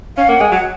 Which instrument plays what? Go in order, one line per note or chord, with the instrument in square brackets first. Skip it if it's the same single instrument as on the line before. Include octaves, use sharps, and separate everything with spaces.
[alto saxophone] C#4 [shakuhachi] F5
[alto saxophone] A#3 [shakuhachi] F#5
[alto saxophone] G#3 [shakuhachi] G#5
[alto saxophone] F#3 [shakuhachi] F#5